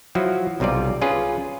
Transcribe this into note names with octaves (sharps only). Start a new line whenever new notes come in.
F3 F#3 E4 F#4
B1 C3 G3 F4 D5
C#4 F4 G#4 B4